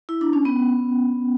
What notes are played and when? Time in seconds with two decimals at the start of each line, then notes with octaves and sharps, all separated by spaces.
0.09 E4
0.21 D4
0.33 C#4
0.45 B3